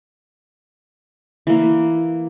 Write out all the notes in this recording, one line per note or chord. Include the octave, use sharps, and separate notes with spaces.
E3 A#3